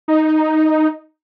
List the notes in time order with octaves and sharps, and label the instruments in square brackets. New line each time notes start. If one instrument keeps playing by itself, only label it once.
[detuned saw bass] D#4